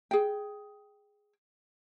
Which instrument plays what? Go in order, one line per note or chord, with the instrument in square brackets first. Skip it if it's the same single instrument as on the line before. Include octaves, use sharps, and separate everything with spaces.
[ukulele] G#4 G5